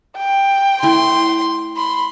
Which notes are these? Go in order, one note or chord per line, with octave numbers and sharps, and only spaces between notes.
G5
A3 E4 C6
B5 C6